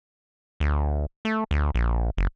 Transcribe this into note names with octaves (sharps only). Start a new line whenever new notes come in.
D2
A3
D2
A#1
F#1